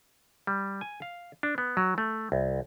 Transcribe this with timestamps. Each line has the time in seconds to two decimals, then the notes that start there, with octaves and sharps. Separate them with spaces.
0.47 G3
0.81 G#5
1.02 F5
1.43 D4
1.58 B3
1.77 F#3
1.98 A3
2.32 C2